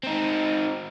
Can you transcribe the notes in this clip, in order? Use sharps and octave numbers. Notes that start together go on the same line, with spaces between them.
C4 D#4